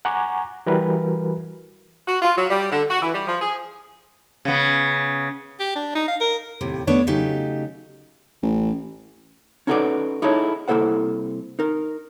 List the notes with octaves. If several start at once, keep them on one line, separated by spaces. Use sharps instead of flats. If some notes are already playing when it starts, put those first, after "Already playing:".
F#5 G#5 A#5 C#6 D6
E3 G3 F#4 A#4 B4
F#4
F4
F#3
G3
D3
F#4
E3
G3
F3
G#4
C#3 B3
G4
D4
D#4
F5
A#4
D#2 A2 C3
A3 B3 D4 A4 C#5
C#3 F#3 A3 D#4 G4
A1
C#4 D#4 F#4 A4 B4 D5
D#4 E4 G#4 A4 C#5 D#5
C2 A#3 E4 A4 C5 F#5
D#4 A#4